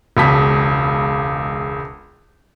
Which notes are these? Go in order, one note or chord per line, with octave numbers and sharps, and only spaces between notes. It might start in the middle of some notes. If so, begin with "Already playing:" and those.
E1 C#2 A5 B6